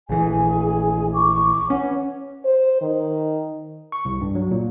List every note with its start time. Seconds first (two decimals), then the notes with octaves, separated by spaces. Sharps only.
0.09 A#1 E3 G#4 G#5
1.14 C#6 D6
1.70 C#4 B4 C#5 F#5
2.45 C5
2.81 D#3
3.92 C#6
4.05 C2
4.21 G2
4.35 F#3
4.51 A#2